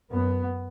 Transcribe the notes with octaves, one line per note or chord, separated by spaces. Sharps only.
F#2 B3